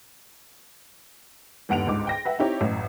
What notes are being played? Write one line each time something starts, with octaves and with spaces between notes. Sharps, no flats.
G1 D#2 F#5 D7 F7
C#2 G#2 D6
G5 A#6
B4 E5 F#5 G5
C4 D#4 E4 G4 C#5
A1 F#2 A2